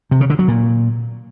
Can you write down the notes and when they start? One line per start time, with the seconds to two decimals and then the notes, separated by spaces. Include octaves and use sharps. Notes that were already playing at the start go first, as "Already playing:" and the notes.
0.11 C3
0.21 C#3
0.30 D3
0.39 F#3
0.48 A#2